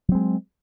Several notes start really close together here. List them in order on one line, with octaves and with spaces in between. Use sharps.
F#3 C4 G#3